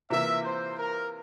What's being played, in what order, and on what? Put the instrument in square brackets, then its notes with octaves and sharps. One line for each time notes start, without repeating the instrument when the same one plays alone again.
[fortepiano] C3 E3 A#3 F4 [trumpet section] E5
[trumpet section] C5
A#4